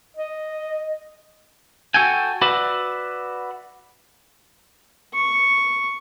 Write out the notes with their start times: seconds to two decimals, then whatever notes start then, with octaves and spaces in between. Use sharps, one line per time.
0.17 D#5
1.94 F#4 A4 G5 G#5
2.42 F#4 B4 D5 E5
5.14 C#6